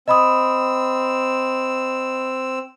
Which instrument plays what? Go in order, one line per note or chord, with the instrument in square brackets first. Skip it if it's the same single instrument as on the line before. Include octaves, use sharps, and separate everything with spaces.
[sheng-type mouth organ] C4 E6 [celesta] D#5 B5 D#6